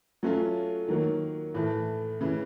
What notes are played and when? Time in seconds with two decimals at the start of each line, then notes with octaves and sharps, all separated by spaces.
0.23 F#3 A3 C#4 F4
0.88 D#3 F#3 A#3
1.54 A2 E3 A3
2.21 C#3 E3